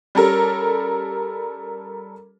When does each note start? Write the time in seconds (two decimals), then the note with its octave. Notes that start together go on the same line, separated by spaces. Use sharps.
0.15 G3 C#4 A4 A#4